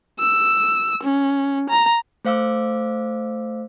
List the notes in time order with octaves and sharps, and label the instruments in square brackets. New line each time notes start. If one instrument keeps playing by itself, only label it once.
[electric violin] E6
C#4
A#5
[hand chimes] A3 C5 F5 D6 E6